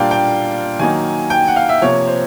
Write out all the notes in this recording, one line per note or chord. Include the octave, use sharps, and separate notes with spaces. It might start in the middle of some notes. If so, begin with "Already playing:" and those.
Already playing: A#2 G3 A#3 D4 F5 G5
G5
D#3 F#3 A#3 D#4 G#5
G5
F#5
F5
E5
C3 F3 A#3 C#5
C5